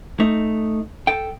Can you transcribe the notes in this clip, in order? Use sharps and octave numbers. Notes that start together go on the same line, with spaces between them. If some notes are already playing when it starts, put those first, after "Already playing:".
A3 D#4
A4 G5